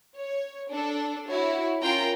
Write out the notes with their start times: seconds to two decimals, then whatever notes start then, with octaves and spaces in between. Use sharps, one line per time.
0.16 C#5
0.70 D4 A4
1.27 E4 F#4 C#5
1.82 C#4 F4 A#4 G5 A#5